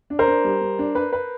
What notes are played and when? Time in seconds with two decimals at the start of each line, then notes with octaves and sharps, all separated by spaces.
0.10 D4
0.19 A#4 C5
0.28 D4
0.44 G3
0.61 G3
0.79 D4
0.95 B4
1.13 B4